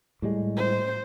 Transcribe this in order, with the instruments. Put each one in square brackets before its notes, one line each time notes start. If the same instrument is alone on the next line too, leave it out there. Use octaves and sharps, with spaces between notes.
[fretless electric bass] A2 G3 G#3
[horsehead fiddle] C5